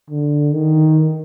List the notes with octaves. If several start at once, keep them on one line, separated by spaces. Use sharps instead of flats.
D3
D#3